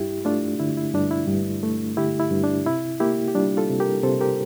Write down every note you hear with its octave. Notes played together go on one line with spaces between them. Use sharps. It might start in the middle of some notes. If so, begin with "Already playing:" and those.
Already playing: G2 E4 G4
A3 D4 F4
D3 E4
E4
G2 D4
E4
G2
A3
D3 E4 G4
E4
G2
D4
C3 E4
A#3 E4 G4
G4
G3 D4 F4
F4 A4
C3
G4 A#4
C3 A4 C5
G4 A#4